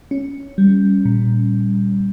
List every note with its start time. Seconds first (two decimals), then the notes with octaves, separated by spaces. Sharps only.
0.11 C#4
0.58 G3
1.05 A#2